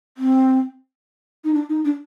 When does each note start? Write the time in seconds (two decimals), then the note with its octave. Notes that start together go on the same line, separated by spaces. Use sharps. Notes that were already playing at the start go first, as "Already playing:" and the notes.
0.17 C4
1.44 D#4
1.54 D4
1.69 D#4
1.85 D4